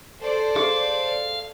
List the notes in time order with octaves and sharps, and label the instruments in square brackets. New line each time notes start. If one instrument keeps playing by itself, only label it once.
[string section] A4 C5 D5
[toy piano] G#4 [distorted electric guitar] F5